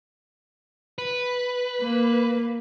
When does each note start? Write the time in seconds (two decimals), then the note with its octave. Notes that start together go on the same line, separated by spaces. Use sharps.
0.98 B4
1.82 A#3